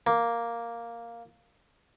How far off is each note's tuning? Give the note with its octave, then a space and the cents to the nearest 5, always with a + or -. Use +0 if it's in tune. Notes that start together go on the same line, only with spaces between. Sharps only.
A#3 +0